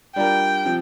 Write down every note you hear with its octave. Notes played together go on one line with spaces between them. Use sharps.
G3 D4 F4 A#4 G5
C3 F3